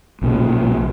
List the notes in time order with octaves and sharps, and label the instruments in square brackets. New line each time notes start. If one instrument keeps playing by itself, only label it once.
[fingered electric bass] B1 A#2 C#3